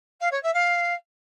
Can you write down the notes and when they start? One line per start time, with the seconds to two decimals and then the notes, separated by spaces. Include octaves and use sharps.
0.20 F5
0.31 C#5
0.43 E5
0.54 F5